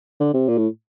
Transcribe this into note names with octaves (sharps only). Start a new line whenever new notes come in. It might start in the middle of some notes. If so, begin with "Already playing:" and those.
D3
C3
A#2
A2